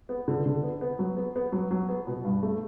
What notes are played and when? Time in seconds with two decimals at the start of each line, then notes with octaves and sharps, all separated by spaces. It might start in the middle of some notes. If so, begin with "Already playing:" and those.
0.09 B3
0.28 D3
0.46 D3
0.63 B3
0.81 B3
0.99 F#3
1.17 B3
1.36 B3
1.52 F#3
1.71 F#3
1.89 B3
2.07 B2
2.24 G2
2.43 A3